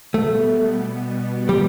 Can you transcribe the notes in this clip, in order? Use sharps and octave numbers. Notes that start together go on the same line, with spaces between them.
B2 G3 A3 B3
G3